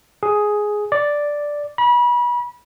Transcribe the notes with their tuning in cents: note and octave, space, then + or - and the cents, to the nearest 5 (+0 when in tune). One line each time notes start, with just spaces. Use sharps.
G#4 +5
D5 +0
B5 -35